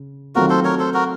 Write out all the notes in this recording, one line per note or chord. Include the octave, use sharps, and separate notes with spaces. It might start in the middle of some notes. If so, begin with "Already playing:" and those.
Already playing: C#3
D#3 F#3 A3 C4 F4 F#4 A#4
A4 C5
A#4 C#5
A4 C5
F#4 A#4